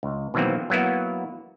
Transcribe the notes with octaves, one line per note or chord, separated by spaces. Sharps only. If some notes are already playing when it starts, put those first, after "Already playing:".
C#2
B2 D#3 E3 F#3 A#3 C4
F#3 A#3 B3 E4 F#4